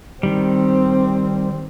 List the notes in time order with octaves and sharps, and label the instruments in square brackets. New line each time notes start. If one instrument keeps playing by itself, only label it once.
[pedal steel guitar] D#3 G3 [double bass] C4